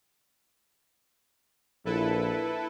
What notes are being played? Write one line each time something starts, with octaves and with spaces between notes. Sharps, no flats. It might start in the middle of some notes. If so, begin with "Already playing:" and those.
A#1 E4 A4 B4